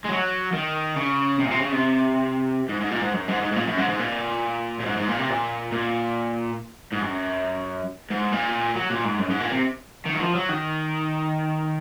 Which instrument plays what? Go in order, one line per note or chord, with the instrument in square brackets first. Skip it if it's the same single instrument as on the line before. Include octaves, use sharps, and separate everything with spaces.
[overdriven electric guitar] G#3
F#3
D#3
C#3
C3
A#2
C3
C#3
C3
G#2
G#2
A#2
G#2
F#2
G#2
G#2
G#2
A#2
F#2
G#2
G#2
A#2
A#2
G#2
G#2
A#2
C3
A#2
A#2
G#2
F#2
G#2
A#2
F#3
A#2
G#2
F#2
G#2
A#2
C3
D#3
F#3
F3
F#3
D#3